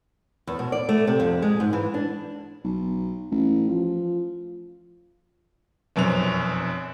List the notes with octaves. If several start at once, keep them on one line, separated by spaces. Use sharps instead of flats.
E2
B2
D5
A3
C3
F2
G#3
G#2
E3
D4
B1
A1
F3
F1 F#2 B2 C5 F7